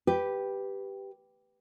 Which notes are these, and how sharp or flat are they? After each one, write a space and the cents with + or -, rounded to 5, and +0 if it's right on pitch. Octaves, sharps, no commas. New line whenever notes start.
G4 +0 B4 +0